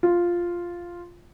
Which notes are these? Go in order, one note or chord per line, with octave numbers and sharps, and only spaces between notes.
F4